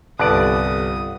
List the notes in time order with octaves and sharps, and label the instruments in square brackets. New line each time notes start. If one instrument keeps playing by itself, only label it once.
[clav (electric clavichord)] G1 D5 [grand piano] C2 A5 [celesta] A4 B4 F#6 [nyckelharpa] D#6